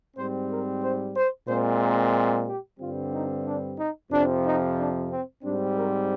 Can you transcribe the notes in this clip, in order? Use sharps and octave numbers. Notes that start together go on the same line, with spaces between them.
G#2 G3 C4 C5
A#4
C5
C5
A#2 G#3 C4 C5
A#4
G4
G2 D3 G3 C4 F4
D#4
D4
D#4
F2 C3 F3 D4
D#4
D4
C4
G#2 G3 C4 D4
A#4